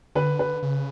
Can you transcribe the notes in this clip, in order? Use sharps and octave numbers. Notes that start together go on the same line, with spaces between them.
D3 B4
B4
C#3